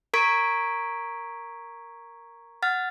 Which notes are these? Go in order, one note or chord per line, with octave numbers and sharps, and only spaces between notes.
A#4 A#5 C#6 G#6 B6 D7
F#5 F6 A6